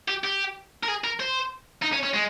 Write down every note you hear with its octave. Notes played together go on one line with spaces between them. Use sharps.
G4
G4
A#4
G#4
A#4
C5
D#4
C#4
C#4
G#3